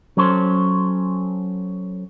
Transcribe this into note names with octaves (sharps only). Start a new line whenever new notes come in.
F#3 C#4 A4 C5